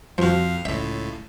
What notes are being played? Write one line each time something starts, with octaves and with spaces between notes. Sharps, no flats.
F2 F3 F#4 F5
C#2 A2 E5